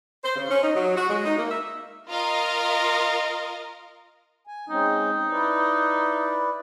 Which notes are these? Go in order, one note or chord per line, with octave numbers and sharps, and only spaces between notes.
C5
C#3
C#4
D#4
F#3
F#4
G#3
D#4
A#3
E5
F4 A#4 D#5 F5
G#5
G#3 C4 C#4 D#4
E4 B4 D5